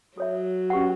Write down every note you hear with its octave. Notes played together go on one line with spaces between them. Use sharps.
F#3 A4 C#5 E5
C#4 G4 B4 F#5